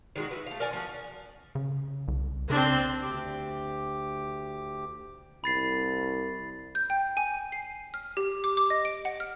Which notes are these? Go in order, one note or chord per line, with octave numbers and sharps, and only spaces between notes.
D#3 G#3 F#4
E4 F#4 B4
A3 F5
A#4 D5 F#5 G#5
F3 F#4
C#3
C2
C#3 C4 D4
D2 G4 D6
C2 B5 A6 C7
G6
G5
G#5
C7
F6
G4
D6
D6
D#5
D7
F#5
F6